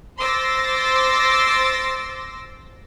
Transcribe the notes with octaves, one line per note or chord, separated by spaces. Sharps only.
C5 C6 D6 E6 A6 A#6